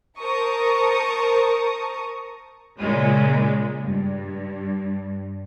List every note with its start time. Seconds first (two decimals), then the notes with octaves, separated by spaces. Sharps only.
0.18 A#4 C5 A5 A#5 C#6 D#6
2.79 A#2 C#3 G#3
3.84 G2